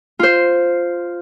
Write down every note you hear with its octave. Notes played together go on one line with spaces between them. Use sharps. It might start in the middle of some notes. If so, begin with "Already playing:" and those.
F4 C5